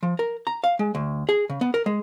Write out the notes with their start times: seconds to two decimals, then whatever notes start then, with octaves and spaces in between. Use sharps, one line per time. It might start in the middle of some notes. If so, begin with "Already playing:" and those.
0.03 F3
0.19 A#4
0.47 A#5
0.64 F5
0.79 G#3
0.95 D2
1.29 G#4
1.50 C#3
1.61 B3
1.74 A#4
1.86 G#3